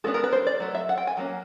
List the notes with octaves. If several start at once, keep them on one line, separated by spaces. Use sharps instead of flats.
G#3 B3 D4 A4
A#4
B4
C5
D5
F#3 A3
E5
F#5
G5
G#5
F#3 A#3 C#4